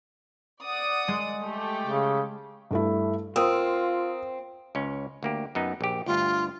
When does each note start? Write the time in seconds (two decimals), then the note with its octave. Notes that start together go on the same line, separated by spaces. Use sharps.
0.64 D5 F#5 D#6
1.08 G#3 G#4
1.42 A3 G4
1.85 C#3
2.71 G2 A3 E4
3.36 C4 F4 A#4 D#6 E6
4.75 C#2 C#4
5.23 D2 A#3 G4
5.55 F#2 B3 D#4
5.81 A#1 G4
6.06 D2 G2 F4